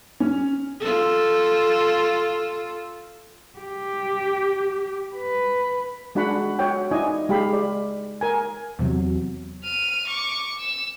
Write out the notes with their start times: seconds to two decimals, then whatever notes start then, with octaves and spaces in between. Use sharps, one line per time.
0.20 C#4
0.80 F4 A4
3.59 G4
5.16 B4
6.15 G#3 D4 F#4 F#5 B5
6.59 F#4 C#5 F#5 G5
6.91 D#4 E4 D5 D#5 G#5
7.29 G#3 G4 F5 G5 B5
7.53 D5
8.21 A#4 G#5
8.79 E2 C3 F#3
9.64 F6 D#7
10.07 C#6 D6
10.59 E6